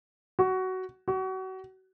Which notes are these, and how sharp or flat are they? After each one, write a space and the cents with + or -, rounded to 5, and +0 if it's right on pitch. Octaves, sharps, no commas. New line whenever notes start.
F#4 +15
F#4 +30